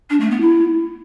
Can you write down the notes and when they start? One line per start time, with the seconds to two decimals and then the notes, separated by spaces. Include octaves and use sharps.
0.10 D4
0.20 A3
0.30 B3
0.41 E4